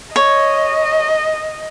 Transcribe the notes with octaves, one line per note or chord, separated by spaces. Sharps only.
C#5 D#5